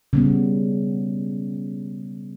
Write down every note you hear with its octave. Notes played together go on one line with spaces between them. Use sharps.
C#3 G3 B3